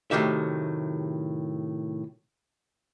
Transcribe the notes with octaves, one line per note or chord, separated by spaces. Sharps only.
A2 C3 D#3 F#3 G4 E5